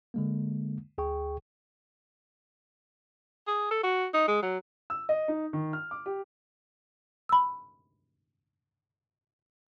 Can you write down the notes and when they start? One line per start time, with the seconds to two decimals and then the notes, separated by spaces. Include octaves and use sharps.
0.14 D3 G#3 A#3
0.98 D2 G#4 G5 C#6
3.47 G#4
3.71 A4
3.83 F#4
4.14 D#4
4.28 G#3
4.43 F#3
4.90 E6
5.09 D#5
5.28 D#4
5.53 D#3
5.73 F6
5.91 D6
6.06 G4
7.29 B5 E6